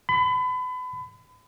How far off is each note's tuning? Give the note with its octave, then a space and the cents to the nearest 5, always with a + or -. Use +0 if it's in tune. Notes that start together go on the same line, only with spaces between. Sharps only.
B5 +30